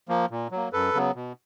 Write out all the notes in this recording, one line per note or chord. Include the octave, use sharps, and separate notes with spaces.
F3 A#3
A#2
F#3 A#3
F#2 A4 B4
C#3 F#3 B3
B2